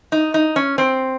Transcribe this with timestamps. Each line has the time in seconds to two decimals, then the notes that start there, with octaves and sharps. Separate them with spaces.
0.12 D#4
0.34 D#4
0.56 C#4
0.78 C4